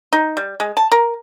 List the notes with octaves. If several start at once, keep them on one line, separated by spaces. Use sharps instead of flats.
D#4
G3
G#3
A5
A#4